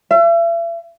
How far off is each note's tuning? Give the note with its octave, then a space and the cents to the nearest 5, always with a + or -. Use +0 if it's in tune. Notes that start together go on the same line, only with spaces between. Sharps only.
E5 +40